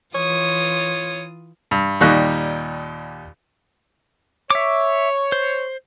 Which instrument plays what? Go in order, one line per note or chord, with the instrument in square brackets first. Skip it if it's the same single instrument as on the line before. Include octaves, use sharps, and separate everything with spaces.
[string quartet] E3 F4 D#6 [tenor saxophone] C#5
[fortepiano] G2
D#2 A#2 G3 D#4 C#6 F#6
[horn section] C#5 [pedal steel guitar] E5 D6
[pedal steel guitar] C5